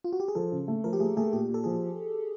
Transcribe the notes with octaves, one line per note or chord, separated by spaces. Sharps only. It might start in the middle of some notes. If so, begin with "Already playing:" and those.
F4
F#4
G4
G#4
F3 A4
C#3
A3
F3 A#4
G4
A3 G#4
A3 G#4
A#2 G4
A#2
A4
F3 G#4